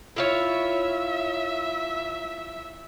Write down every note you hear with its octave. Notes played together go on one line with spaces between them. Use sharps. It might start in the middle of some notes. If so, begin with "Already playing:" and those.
E4 F4 C#5 E5